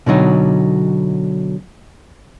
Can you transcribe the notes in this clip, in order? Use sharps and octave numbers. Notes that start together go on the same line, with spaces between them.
B2 D3 F#3 D#4